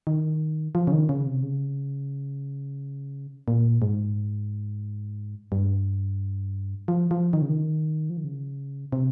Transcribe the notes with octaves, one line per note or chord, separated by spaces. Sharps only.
D#3
F3
C#3
D#3
C#3
C3
C#3
A#2
G#2
G2
F3
F3
D#3
C#3
D#3
F3
D#3
C#3
C3